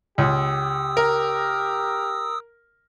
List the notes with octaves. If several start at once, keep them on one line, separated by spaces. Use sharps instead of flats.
C#2 G4 D#6 E6
A#4